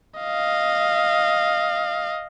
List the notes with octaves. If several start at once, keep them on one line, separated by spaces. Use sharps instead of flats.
D#5 F5